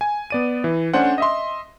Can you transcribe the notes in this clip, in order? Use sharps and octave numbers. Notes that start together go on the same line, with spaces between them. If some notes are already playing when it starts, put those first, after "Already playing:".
G#5
B3 D5 D#7
E3
A3 C#4 D4 C5 F#5
D#5 E5 C6